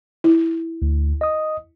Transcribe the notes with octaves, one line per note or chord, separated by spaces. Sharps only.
E4
D2
D#5 D#6